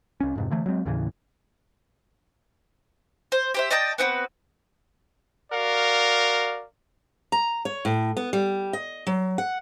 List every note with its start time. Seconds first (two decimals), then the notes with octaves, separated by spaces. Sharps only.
0.20 C2 C#4
0.36 F2 G#2 C3
0.50 D3 E3 A3
0.66 F#3 G#3 C4
0.85 D#2 A2 C#3 E3
3.32 C5
3.54 G4 C5 E5
3.70 D5 D#5 G5 A5
3.98 B3 C4 F#4 B4
5.52 F#4 A#4 D5 F5
7.32 A#5
7.65 C#5
7.85 A2
8.17 B3
8.33 G3
8.73 D#5
9.07 F#3
9.38 F#5